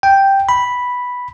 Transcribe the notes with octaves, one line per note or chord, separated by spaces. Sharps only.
G5
B5